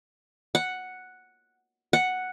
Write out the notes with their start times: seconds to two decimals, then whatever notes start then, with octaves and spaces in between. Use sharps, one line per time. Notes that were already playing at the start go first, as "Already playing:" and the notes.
0.55 F#5
1.93 F#5